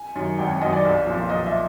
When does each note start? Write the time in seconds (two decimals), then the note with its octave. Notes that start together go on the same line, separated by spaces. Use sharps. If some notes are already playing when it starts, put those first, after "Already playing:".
Already playing: G#5
0.15 F#2 D#3
0.39 G#1 G5
0.50 G#5
0.61 F#2 D#3 D#5
0.73 D5
0.85 B1
1.07 A#2 F3
1.30 B1 D#5
1.46 E5